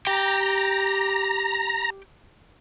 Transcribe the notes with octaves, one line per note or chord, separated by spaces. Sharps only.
G4 G5 A#5